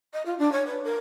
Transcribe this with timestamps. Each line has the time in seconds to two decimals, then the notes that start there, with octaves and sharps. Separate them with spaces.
0.13 D#5
0.25 F4
0.38 D4
0.52 C#5
0.66 B4
0.84 A#4